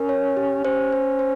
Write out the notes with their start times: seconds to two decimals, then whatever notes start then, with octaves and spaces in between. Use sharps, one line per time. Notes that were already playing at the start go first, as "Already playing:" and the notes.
Already playing: C#4 A#4
0.09 C#5
0.37 G4
0.65 C#4 C5
0.93 C5
1.19 C5